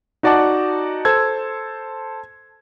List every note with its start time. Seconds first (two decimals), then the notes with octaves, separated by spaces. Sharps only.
0.23 D#4 F#4 D5 F#5 A5 D6
1.05 A4 C5 A5 E6 G#6